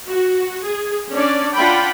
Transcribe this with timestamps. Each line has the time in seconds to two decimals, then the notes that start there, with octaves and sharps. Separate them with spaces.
0.11 F#4
0.64 G#4
1.13 C#4 D4 D5
1.56 D4 F4 F#5 G5 B5